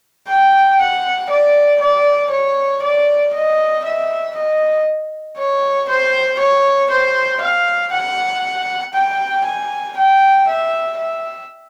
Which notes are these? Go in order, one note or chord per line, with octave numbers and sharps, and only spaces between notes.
G5
F#5
D5
D5
C#5
D5
D#5
E5
D#5
C#5
C5
C#5
C5
F5
F#5
G5
G#5
G5
E5
E5